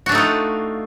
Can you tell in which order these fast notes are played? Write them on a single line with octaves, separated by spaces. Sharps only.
F#4 D4 A3 D#4 F4